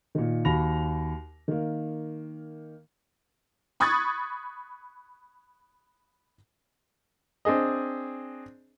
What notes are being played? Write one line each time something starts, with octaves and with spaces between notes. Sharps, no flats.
A#2 D#3
D#2 F#4 B5 A#6 F7
D#3 A#3
B5 C#6 D#6 F#6 G#6 A6
C4 D4 G#4 D#5